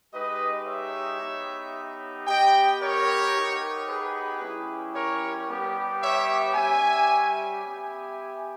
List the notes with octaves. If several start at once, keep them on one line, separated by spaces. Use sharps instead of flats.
G#3 D#4 G4 B4 D#5
C#5 E5
B3 D#4 G4
B3 G4 D#5 G5
A#4 C#5
B3 D#4 G4
G#4 B4
G3 C#4 E4 G4
A#4 C#5
G3 B3 G4
C#5 E5
G3 C#4 G4 E5 G#5
B3 G4 E5 G#5